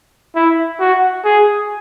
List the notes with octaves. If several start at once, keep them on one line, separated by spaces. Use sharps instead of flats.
E4
F#4
G#4